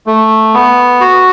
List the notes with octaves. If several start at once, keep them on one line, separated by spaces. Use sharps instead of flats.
A3
B3
F#4